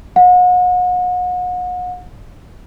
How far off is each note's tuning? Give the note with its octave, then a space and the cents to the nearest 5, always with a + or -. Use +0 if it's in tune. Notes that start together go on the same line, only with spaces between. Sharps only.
F#5 -40